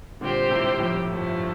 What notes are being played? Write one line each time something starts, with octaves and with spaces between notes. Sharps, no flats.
A#2 D3 G3 C4 G4 C5
A2 C3
F2 A2
G2 F3 A3